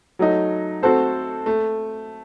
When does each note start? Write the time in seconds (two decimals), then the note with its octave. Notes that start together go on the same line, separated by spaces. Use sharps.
0.19 F#3 A3 D#4
0.83 A3 C4 F#4 A4 C5
1.46 A3